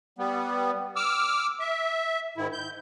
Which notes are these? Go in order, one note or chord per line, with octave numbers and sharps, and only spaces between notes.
G3 B3
D6 E6 F6
E5
G#2 D#3 E4
G6